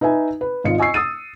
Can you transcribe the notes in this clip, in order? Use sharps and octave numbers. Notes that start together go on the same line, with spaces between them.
D#4 B4 E5 G#5
B4
G#1 F4 D#5 C#7
D#5 G#5 C#6 E6 C7
D#6 E6 A6 D#7